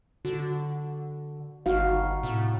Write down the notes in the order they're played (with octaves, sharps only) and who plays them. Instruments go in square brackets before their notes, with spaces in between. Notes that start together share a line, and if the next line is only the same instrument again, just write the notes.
[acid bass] D3 [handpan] F#4
[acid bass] G1 [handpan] D#4 F#4 F5
[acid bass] A2 [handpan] C3